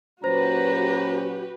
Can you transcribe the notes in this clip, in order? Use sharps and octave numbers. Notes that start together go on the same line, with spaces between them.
A#2 F#3 C#4 F#4 G4 B4 C5 A#5